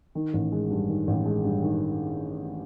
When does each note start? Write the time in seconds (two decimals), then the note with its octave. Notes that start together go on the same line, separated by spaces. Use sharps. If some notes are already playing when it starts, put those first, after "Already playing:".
0.15 D#3
0.33 A1
0.52 G#3
0.71 G2
0.89 D#3
1.07 A1
1.25 G#3
1.44 G2
1.63 D#3